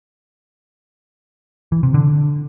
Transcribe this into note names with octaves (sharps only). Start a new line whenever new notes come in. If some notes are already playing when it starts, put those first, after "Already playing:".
E3
C3
D3